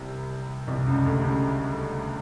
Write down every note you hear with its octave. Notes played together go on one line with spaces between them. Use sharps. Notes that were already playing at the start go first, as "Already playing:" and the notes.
Already playing: C2 C3
C2 C3
C#2 C#3
D2 D3
C#2 C#3